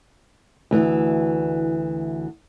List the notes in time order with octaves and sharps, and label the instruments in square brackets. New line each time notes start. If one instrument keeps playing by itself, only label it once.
[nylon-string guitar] D2 E3